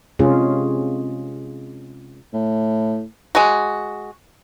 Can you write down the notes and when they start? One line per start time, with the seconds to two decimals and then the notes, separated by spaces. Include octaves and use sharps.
0.19 C3 G#3 C#4 F4 G#4
2.33 A2
3.35 G#3 F#4